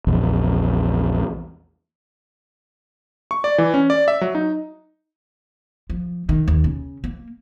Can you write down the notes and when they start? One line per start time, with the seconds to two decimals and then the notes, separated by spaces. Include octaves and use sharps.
0.07 A#1 E2
3.31 C#6
3.44 D5
3.58 E3
3.74 C#4
3.90 D5
4.08 E5
4.21 F#3
4.35 D#4
5.90 F3
6.29 D#3
6.48 D#2
6.64 C#3
7.04 A#3